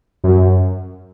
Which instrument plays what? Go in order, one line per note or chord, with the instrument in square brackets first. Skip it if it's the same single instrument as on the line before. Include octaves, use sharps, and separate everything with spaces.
[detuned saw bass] F#2